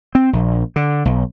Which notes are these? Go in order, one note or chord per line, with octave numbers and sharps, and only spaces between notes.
C4
A#1
D3
B1